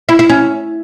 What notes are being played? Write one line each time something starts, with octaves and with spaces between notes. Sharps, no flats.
E4
E4
C#4